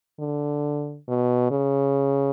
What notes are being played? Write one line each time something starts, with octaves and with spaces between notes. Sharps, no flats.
D3
B2
C#3